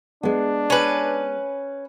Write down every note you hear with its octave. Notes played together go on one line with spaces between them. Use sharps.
G#3 B3 D4
C#4 B4